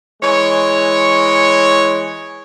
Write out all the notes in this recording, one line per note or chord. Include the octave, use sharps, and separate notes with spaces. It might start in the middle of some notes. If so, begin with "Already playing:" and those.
E3 G#3 C#5